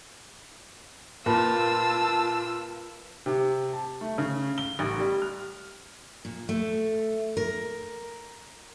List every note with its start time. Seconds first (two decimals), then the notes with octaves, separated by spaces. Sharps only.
1.26 A#2 F4 A#4 B4 A5 B5 E6
3.26 C3
3.73 A5
4.01 A3
4.18 C#3
4.58 G7
4.79 A1
4.99 G3
5.22 F6
6.25 A#2
6.49 A3
7.37 A#4